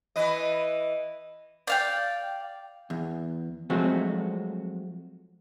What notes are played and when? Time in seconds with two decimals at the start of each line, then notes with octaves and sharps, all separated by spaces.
0.16 E3 B4 D#5
1.67 D5 F5 G5
2.90 E2
3.70 F3 F#3 G#3 A3 C4 F#4